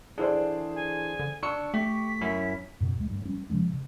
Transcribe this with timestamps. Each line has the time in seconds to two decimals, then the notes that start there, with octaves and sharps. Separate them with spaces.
0.18 D3 E3 D4 G#4 C5 D5
0.75 G#5
1.19 D3
1.43 D4 C#6 E6 C#7
1.74 A3 G4 B6
2.21 F#2 C#4 E4
2.80 F#2 B2
2.96 D2 G#3
3.10 G2
3.25 G3 C#4
3.50 C3 F3 G#3 C#4
3.73 C3